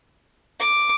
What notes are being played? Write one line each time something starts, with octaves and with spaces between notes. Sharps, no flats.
D6